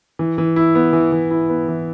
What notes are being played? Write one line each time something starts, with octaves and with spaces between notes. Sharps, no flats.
E3
E3
E4
B3
E3
E3
E4
B3
E3